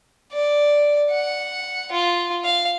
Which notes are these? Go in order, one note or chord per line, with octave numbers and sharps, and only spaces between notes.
D5
F#5
F4
F5